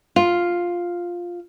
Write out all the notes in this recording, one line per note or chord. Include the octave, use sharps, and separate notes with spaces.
F4